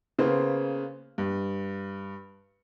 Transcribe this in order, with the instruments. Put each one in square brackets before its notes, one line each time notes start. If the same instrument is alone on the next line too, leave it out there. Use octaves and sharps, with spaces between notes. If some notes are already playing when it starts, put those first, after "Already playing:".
[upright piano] C#3 A#3 B3 C5
G2